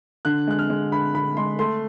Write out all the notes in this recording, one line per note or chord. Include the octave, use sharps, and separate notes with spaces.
D3 F#6
G#3 F#6
F6
G#3
D3 B5
D3 B5
G#3 C6
A3 C6